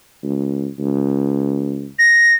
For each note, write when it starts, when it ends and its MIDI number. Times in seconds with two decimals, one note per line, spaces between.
0.24 0.68 37
0.79 1.88 37
1.99 2.34 94